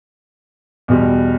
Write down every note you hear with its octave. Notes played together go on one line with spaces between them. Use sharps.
E2 B2 G3